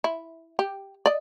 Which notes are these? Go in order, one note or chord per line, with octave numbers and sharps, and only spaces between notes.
E4
G4
D5 D#5